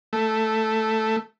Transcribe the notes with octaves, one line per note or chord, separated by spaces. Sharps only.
A3